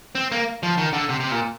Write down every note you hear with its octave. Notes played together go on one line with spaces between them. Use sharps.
C4
A#3
F3
D#3
D3
C3
C3
A#2